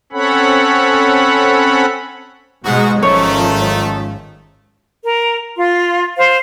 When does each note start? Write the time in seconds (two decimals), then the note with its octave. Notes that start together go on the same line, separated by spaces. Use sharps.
0.12 C4 C#4 A4 C#5 F#5 B5
2.64 G#2 B2 G#3 F#4
3.03 G#1 D#3 F3 A3 C#4 C#5
5.03 A#4
5.56 F4 C6
6.17 C5 F5